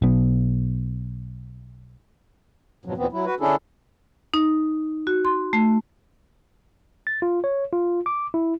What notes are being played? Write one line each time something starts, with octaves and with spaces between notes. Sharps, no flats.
B1 B3
F2 G#2 B2 F3 F#3
D#2 A#2 E3 B3 C4
F#3 E4
F#4 B4
D3 C#4 D4 E4 G#4 A4
D#4
F#4
C6
A3
A6
F4
C#5
F4
D6
E4